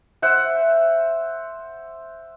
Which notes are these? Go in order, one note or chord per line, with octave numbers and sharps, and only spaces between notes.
C5 E5 F#5